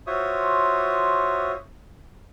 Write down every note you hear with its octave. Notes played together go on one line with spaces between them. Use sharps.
F4 F#4 C5 C#5 E5 D#6